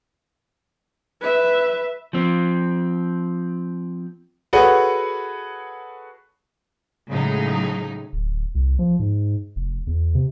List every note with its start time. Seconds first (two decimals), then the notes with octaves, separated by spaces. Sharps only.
1.21 B4 E5
2.13 F3 C4
4.53 F#4 G#4 A4 B4 C#5 F#5
7.09 A2 C#3 F#3 G#3 D#4
8.13 D1
8.55 C2
8.79 F3
8.99 G#2
9.56 F1
9.87 E2
10.15 C3